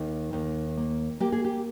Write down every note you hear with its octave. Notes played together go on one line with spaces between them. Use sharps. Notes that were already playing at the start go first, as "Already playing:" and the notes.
Already playing: D#2 D#4
D#2
A#3
A#3 G4
G#4
G4